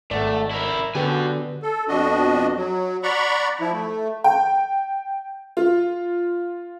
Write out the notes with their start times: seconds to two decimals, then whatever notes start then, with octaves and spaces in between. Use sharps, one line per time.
0.11 G#1 A3 D5 F#5
0.51 E4 A#4
0.95 D3 B3 F#4 G4 G#5
1.62 A4
1.88 F2 B2 D4 F#4 D#5
2.56 F#3
3.03 D5 F#5 A#5 B5 C#6
3.60 F3 E4
3.72 A3
4.24 G5
5.57 F4